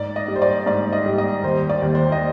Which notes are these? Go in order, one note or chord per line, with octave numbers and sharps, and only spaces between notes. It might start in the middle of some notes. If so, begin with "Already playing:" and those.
Already playing: G#2 D5
D#5
G3
C5
D5
G#2 D5
D#5
G3
D#5
D#2 C5
D5
D#2
C5
D#5